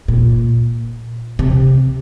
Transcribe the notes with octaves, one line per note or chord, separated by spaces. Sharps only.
A#2
C3